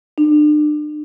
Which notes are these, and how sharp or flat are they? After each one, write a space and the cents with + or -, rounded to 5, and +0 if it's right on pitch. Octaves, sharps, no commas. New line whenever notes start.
D4 +40